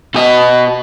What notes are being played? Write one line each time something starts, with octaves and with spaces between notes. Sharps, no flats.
B2 D#5